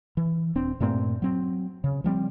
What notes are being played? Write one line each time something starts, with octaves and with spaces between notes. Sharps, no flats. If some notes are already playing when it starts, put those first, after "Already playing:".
E3
D#1 C4 D4
G2 A#2 A3 C4
F#3 C4
C#3
F3 G3 A#3 C4